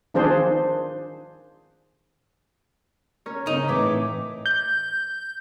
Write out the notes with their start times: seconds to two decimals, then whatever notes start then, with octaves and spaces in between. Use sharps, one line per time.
0.14 D#3 F3 C4 D4 G#4 C5
3.26 C#4 A#4 C#5
3.47 C#3 C4 D#4
3.68 A2 E3 E5 D6
4.46 G6